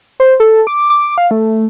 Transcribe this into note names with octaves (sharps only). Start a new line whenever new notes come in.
C5
A4
D6
D6
F5
A3